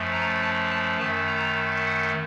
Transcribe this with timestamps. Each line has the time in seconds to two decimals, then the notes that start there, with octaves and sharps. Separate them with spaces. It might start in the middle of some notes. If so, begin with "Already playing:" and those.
Already playing: F#2 F3 A3
0.13 A#5
0.42 A5
0.71 A5
0.99 F#2 D#3 A3 A5
1.27 A#5
1.85 F#5